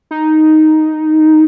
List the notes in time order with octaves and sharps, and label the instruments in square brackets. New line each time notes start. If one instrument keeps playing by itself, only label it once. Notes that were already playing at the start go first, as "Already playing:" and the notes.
[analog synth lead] D#4